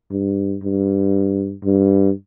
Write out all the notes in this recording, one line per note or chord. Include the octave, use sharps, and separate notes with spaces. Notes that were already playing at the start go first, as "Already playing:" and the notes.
G2
G2
G2